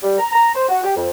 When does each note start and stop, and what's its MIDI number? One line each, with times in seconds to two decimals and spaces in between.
0.03 0.17 55
0.19 0.30 82
0.33 0.51 82
0.55 0.68 72
0.69 0.83 66
0.83 0.93 67
0.96 1.09 41